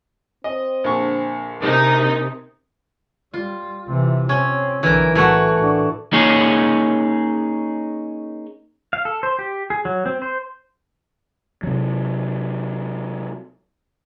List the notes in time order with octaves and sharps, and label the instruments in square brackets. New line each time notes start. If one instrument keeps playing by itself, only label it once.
[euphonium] C4 [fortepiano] D#5
[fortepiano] A#1 D3 C#6
[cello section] C3 [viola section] D#4 [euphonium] A#4
[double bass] G3 [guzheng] F4
[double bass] C3 E3
[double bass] C4 [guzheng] C#4
[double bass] B1 D3 [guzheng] E3 A#4
[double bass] A2 [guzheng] E3 A3 F#4
[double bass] A2 D4
[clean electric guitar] A#3 C#4 D#4 G#4 C#5
[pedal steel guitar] F5
A4
C5
G4
G#4
F#3
C4
C5
[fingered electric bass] C3 F#3